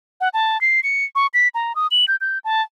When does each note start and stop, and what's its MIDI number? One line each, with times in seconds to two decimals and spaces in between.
0.21 0.29 78
0.34 0.60 81
0.61 0.80 96
0.83 1.05 97
1.15 1.27 85
1.34 1.48 95
1.55 1.75 82
1.76 1.87 87
1.91 2.05 102
2.08 2.16 91
2.21 2.39 91
2.44 2.62 81